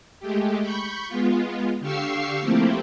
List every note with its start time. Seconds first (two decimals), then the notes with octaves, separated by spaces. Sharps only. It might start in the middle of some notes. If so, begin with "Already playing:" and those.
0.20 G#3 A3 G4
0.62 B5 C#6 G6
1.08 G#3 B3 F4
1.80 D3 G4 F5 C#6 E6 C7
2.41 F3 A3 A#3 C4 E4 G4